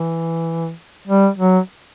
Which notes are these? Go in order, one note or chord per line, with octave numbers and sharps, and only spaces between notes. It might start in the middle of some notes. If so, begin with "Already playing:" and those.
Already playing: E3
G3
F#3